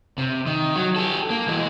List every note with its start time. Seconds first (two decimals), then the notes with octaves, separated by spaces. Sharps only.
0.18 C3
0.46 D#3
0.76 F#3
0.96 G4 A4
1.30 A#3
1.48 E3 G#3